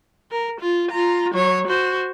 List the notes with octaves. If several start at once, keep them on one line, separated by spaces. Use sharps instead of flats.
A#4
F4
F4 A#5
F#3 C#5
F#4 C5